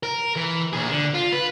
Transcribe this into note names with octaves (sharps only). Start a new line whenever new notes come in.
A#4
E3
A#2 G#4
D3
F4
B4